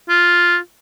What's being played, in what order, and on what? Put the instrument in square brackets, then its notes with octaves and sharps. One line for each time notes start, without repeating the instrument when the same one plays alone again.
[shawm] F4